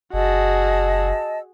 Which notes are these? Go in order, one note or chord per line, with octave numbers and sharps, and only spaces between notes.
F#1 F#4 G#4 D#5 A5 E6